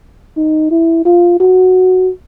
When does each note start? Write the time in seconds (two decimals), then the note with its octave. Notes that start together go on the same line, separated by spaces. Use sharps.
0.37 D#4
0.71 E4
1.05 F4
1.40 F#4